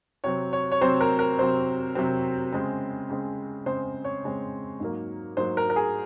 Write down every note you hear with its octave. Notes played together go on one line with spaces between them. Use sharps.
C3 F#3 C4 C#5
C#5
C#5
C3 F#3 C4 C5
A#4
A#4
C3 F#3 C4 C5
C3 F#3 C4
C#3 G#3 C4
C#3 G#3 C4
C#3 G#3 C4 C5
C#5
C#3 G#3 C4
G#2 F#3 A#3
G#2 F#3 A#3 C5
A#4
A#4
G#4